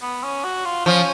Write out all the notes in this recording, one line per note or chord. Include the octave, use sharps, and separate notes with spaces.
B3
C#4
F#4
F4
F3 C#4